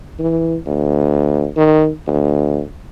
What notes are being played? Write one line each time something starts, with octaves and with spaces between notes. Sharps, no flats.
E3
D2
D#3
D2